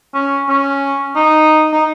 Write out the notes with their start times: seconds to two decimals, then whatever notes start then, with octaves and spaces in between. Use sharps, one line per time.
0.14 C#4
0.49 C#4
1.16 D#4
1.73 D#4